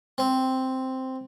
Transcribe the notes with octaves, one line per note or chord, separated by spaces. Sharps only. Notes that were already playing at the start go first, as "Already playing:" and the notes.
C4